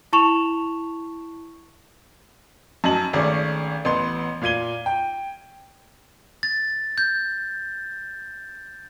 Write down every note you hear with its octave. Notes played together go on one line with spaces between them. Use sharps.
E4 A5 C#6 E7 F7
F#2 F#3 D#5 A5 F#7
G#1 A3 C#4 G#4 D5
A1 B3 C6
A#2 F4 G#6 D#7 G7
G5
A6
G6